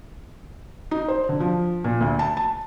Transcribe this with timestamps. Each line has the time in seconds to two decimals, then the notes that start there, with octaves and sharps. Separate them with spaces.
0.91 D#4
1.08 C5
1.29 D3
1.40 F3
1.84 A#2
2.01 D2
2.19 A5
2.37 A5